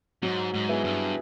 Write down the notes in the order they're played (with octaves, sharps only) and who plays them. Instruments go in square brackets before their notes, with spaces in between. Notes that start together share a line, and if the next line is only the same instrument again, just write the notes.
[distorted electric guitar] G#2 [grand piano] F#3
[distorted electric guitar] G#2
[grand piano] B3 E4 G#4
[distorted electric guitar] G2